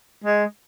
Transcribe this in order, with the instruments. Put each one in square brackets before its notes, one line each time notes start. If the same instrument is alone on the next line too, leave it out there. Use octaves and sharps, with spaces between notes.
[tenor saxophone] G#3